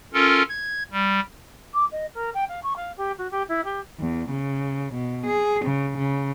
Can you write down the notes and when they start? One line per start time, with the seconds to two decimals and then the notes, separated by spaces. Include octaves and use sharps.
0.14 C#4 F4 A4 A#4
0.49 G#6
0.92 G3
1.73 D6
1.91 D#5
2.14 A#4
2.34 G5
2.48 F5
2.63 C#6
2.76 F5
2.97 G4
3.18 F#4
3.31 G4
3.48 E4
3.64 G4
4.00 E2
4.30 C#3
4.94 B2
5.26 G#4
5.65 C#3
5.98 C#3